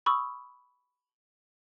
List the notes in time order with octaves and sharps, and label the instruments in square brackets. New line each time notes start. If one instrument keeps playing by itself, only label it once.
[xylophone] B5 C#6 D#6 E6